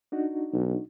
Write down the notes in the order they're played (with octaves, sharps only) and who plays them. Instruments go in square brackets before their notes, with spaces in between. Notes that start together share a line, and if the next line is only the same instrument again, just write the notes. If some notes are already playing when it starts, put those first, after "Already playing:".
[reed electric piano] D4 D#4 F#4
[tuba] B1